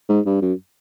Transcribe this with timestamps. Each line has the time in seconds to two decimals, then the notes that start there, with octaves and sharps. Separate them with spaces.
0.09 G#2
0.26 G2
0.41 F#2